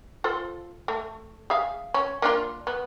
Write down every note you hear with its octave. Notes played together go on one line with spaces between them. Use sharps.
F4 A4 C5
A3
G#4 E5 F5
C#4
A#3 D4 F4
B3